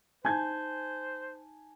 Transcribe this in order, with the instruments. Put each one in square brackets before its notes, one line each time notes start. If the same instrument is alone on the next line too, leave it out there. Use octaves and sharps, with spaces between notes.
[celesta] D#4 A5 [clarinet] C5 [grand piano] G#5 G6 G#6